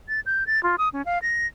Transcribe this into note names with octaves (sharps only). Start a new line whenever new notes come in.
A6
G6
A6
F4
D#6
C#4
F5
A#6